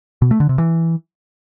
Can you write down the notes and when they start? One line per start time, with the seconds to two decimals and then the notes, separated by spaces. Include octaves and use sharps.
0.22 B2
0.31 A3
0.40 D3
0.49 C3
0.58 E3